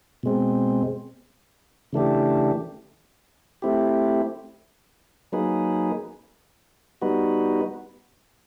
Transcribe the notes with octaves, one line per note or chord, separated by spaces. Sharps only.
B2 G#3 C4
C#3 E3 A3 D4 G4
A3 C4 E4 G4
F#3 A#3 D#4 G#4 B4
G3 B3 D#4 F#4 B4